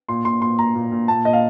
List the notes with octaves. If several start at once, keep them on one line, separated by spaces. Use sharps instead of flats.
A#2 C6
A#2 C6
A#2 C6
A#2 A#5
A#2
A#2
A#2 A5
A#2 D#5
F5